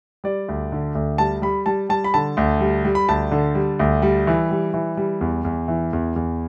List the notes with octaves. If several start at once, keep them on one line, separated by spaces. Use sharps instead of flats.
G3 D5
D2
D3
D2
G3 A5
G3 B5
G3 A5
G3 A5
B5
D3 A5
D2
G3
G3
B5
D2 A5
D3
G3
D2
G3
E3
G3
E3
G3
E2
E2
E3
E2
E2